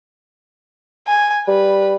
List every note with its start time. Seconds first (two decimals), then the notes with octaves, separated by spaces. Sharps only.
1.07 G#5
1.48 G3 B4